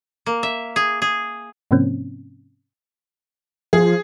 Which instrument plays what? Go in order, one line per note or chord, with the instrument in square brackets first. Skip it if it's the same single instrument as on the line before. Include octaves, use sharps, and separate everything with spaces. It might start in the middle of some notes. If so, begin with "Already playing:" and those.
[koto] A#3
E5
G#4
G#4
[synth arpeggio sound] G#2 C3 F3 A#3 C4 C#4
[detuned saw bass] F3 [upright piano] G#4